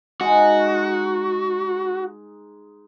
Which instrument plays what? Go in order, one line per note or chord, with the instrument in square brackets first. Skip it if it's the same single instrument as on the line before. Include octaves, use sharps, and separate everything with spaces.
[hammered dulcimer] G#3 D#4 [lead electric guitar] F#4